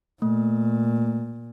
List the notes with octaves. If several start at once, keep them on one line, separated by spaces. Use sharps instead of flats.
A#2 A3